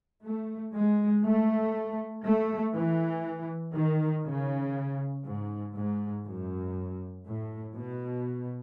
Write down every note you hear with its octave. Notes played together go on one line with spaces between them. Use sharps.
A3
G#3
A3
A3
E3
D#3
C#3
G#2
G#2
F#2
A2
B2